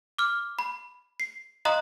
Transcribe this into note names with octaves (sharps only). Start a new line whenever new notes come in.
D6 F6
B5
C7
D#5 F5 A#5 C6 D#6 F#6